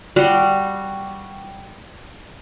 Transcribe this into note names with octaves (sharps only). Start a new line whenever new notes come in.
G3 F#4